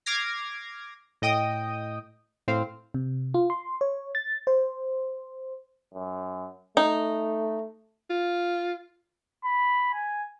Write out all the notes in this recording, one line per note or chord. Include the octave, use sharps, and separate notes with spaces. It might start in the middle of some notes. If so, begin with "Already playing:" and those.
D6 F6 G#6 A#6 C7
A2 D#5 G5 D#6
A2 C4 F5
C3
F4
C6
C#5
A6
C5
F#2
A3 D#4
F4
B5
G#5